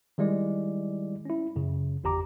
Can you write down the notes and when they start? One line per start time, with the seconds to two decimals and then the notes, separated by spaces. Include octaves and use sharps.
0.18 D#3 G3 G#3 E4 D5
1.25 C#4 E4
1.56 F#2 C#3
2.04 G1 E2 G4 A#5 D6